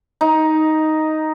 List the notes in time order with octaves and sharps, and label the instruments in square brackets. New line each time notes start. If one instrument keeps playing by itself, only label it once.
[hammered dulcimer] D#4